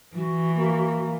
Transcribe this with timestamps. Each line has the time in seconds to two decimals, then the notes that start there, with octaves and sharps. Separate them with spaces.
0.16 E3 F#4
0.55 A#3